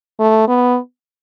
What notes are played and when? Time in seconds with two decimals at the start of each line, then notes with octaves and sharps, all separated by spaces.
0.20 A3
0.48 B3